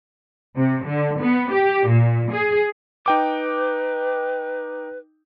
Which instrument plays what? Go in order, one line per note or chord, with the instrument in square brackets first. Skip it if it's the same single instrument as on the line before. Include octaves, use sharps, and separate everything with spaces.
[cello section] C3
D3
B3
G4
A#2
G#4
[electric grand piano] D#4 G5 D6 [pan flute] B4